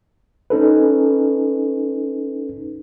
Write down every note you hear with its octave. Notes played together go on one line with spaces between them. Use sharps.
C#4 D#4 A4 B4